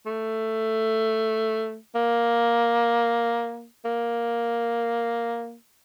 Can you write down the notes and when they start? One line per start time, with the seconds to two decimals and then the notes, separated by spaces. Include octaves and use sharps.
0.06 A3
1.95 A#3
3.85 A#3